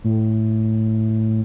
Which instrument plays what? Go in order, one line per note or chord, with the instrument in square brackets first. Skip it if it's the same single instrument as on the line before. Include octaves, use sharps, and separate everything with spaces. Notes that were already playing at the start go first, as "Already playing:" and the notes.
[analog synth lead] A2